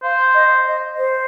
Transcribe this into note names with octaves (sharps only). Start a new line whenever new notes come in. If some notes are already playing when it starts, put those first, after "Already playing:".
C5 F5
D#5
D#5
C5